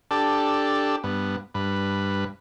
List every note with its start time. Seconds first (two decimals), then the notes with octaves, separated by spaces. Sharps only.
0.11 D4 G4 A4
1.04 G2 B3
1.55 G2 B4